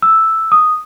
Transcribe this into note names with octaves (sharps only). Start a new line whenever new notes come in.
E6
D#6